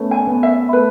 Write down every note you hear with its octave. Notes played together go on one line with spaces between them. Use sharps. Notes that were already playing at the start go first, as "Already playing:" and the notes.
Already playing: A3 B3 C#4
G#5
B3
E5
A3 B4